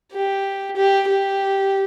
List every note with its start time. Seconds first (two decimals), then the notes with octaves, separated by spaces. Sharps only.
0.13 G4
0.77 G4
1.08 G4